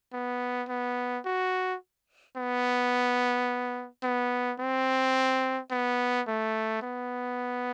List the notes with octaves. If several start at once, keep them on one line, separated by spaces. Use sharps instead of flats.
B3
B3
F#4
B3
B3
C4
B3
A3
B3